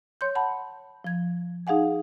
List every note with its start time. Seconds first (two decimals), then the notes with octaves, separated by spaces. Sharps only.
0.21 C#5 C6 G6
0.35 F#5 A5 B5
1.04 F3 G#6
1.67 D#4 G#4 F5 F#5 G#5